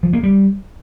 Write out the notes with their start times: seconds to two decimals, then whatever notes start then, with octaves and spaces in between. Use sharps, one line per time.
0.03 F3
0.13 A#3
0.23 G3